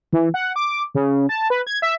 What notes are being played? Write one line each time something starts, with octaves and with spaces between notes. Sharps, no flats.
E3
F#5
D6
C#3
A5
B4
G#6
E5